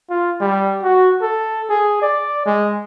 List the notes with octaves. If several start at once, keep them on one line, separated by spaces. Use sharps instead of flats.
F4
G3
F#4
A4
G#4
D5
G#3